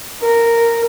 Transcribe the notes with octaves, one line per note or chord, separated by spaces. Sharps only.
A#4